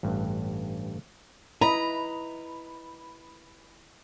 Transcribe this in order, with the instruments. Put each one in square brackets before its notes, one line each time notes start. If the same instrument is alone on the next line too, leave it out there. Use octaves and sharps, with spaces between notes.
[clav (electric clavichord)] A1 G2
[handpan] E4 D#5 [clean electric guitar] B4 [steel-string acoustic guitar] A#5 [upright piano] B5